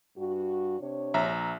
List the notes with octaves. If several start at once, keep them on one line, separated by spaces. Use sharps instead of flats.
G2 F#4
C3 D4 C#5
A#1 E5 A#5